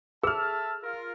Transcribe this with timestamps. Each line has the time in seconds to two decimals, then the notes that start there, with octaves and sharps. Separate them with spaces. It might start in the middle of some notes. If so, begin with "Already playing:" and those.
0.24 G#4 A4 E5 A5 E6 F6
0.82 F4 A#4